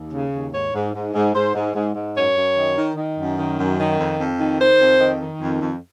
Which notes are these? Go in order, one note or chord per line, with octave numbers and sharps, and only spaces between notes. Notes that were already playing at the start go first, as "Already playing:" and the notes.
Already playing: D#2
C#3
D#2
G#2 C#5
G#2
G#2
G#2
G#2 C5
G#2
G#2
G#2
F#2 C#5
F#2
D#3
D#3
D#3
F#2
D#3
F#2
D#3
F2
F2
D#3
D#3 C5
F2
D#3
D#3
F2
F2